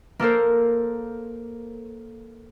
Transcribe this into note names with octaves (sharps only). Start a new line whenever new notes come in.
A#3 A4 A#4 C5